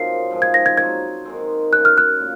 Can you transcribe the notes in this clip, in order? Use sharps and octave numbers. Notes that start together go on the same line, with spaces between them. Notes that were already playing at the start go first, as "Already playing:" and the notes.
Already playing: F#2 C#3 F3 A#3 C4 D#4 A#4 C7
G#2 F3 G#3
G#6
A#6
G#6
F#3 C4 F#4 G#6
D#3 G#3 C4
F#2 C#3 G#3 C#4 F#6
F6
F#6
A#2